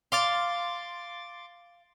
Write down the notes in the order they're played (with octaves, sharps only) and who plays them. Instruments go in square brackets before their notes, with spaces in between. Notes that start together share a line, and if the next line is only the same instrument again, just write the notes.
[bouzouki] F5 [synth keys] C6 D6 A6